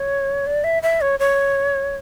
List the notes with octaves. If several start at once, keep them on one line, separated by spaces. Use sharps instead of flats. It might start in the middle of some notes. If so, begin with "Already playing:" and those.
Already playing: C#5
D5
E5
E5
C#5
C#5